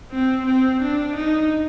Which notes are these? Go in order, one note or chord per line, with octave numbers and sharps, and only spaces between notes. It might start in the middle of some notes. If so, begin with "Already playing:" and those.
C4
C4
D4
D#4